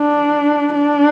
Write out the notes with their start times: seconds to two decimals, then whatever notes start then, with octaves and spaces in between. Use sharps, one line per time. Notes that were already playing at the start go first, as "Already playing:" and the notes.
Already playing: D4
0.74 D4